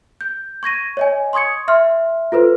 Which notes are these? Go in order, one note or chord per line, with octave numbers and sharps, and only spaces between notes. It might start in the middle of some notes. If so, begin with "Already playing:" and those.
G6
C#6 G#6 A#6 D#7
C#5 D#5 G#5
C6 C#6 D#6 G#6 C#7
E5 C6 F6
F4 A4 B4 C5